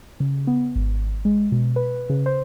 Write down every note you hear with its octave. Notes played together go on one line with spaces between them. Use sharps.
C#3
B3
G#1
G#3
B2
B4
C#3
C5